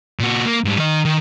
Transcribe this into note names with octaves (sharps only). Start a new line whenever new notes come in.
A#2 F#4
A#3
G#2 G3
D#3 D#5
D#3